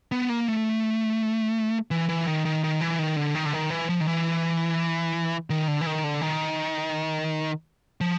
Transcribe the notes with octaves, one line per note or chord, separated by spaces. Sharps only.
B3
A#3
A3
E3
E3
D#3
D#3
D#3
E3
D#3
D3
D#3
D3
D#3
E3
F3
D#3
E3
D#3
D3
E3
D#3
D3
D#3
F3